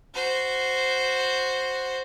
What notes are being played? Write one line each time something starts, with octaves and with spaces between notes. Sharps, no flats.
F#4 C5